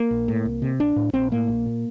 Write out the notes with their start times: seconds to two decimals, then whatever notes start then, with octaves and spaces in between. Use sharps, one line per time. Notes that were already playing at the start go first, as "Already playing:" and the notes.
Already playing: A#3
0.11 A#1
0.28 A2
0.45 C2
0.62 C3
0.79 A#1 D4
0.96 A2
1.13 A#1 C4
1.31 A2 A#3
1.48 A#1
1.66 A#2